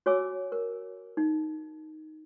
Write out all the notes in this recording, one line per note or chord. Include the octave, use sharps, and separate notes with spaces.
F#4 C#5 G#5 D6 E6
A#4
D#4